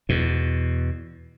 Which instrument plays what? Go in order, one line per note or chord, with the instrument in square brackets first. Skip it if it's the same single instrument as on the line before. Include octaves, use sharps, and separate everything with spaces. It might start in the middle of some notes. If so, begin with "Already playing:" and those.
[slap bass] E2 B2